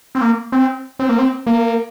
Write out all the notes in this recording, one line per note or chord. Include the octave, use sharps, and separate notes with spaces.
C4
A#3
C4
C4
A#3
C4
A#3